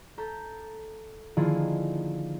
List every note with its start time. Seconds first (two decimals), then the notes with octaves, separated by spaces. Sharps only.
0.18 A4 A#5 G6 B6
1.37 D3 D#3 F3 A#3 E4 G#4